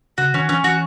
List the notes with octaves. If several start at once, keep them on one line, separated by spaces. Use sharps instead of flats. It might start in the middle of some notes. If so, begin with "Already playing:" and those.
C#3 F#4
D#3 C#4
E3 C#4
E3 F#4